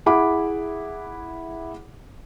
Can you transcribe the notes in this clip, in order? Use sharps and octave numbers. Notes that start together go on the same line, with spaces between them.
E4 G#4 F#5 B5 D6